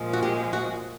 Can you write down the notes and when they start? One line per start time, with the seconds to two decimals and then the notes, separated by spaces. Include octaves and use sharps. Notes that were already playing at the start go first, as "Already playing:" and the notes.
Already playing: A#2 F3 G#3
0.13 F#4
0.22 G4
0.53 F#4